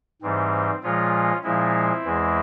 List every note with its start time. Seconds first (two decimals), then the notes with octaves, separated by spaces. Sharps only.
0.22 G#2 E3 G3 C4
0.83 A#2 F3 G#3 C#4 F4
1.43 A#2 F3 G#3 C4 E4
2.04 E2 E3 G#3